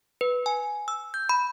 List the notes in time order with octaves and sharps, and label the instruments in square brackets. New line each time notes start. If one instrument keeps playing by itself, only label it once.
[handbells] B4
G#5
E6
G6
B5